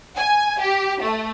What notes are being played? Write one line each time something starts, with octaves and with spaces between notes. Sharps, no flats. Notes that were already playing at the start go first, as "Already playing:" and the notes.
G#5
G4
A3